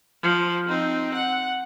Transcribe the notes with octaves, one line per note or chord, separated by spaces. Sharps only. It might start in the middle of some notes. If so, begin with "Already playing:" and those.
F3
C4 D#4
F#5